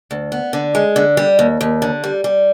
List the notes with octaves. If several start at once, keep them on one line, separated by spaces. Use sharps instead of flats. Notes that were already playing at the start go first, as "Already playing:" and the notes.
D2
B3
D3
G#3
D3
G3
D#2
D#2
D3
G3
G3